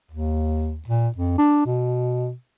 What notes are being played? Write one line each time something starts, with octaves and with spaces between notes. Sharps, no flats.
D#2
A#2
F2
D4
B2